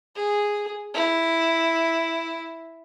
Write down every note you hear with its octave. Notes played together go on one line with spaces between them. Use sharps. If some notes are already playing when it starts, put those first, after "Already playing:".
G#4
E4